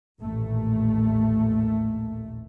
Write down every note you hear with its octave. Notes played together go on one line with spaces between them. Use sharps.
A1 D#2 A#2 A3